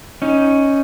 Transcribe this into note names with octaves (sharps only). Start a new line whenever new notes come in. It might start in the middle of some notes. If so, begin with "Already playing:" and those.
C#4 D#4